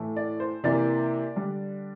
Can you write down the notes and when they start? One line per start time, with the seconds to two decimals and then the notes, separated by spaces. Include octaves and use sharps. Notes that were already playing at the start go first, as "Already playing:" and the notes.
Already playing: A2 E3 A3
0.16 D5
0.40 C5
0.64 C3 E3 A#3 D5
1.36 D3 G3 D4